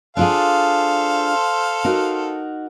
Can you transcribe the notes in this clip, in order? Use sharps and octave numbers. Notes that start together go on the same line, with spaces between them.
D4 F4 G#4 A4 C5 F5
D#4 F#4 A#4